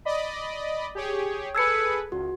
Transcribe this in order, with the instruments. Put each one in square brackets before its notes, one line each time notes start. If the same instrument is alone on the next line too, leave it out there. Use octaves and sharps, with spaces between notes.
[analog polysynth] D5 D#5 B5
G4 G#4 C#5
[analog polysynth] G#4 A4 B4 [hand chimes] E6 G#6 C#7
[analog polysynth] C#2 [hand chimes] F#4